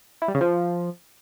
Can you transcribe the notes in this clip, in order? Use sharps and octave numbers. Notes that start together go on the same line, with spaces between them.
E4
G3
C#3
F3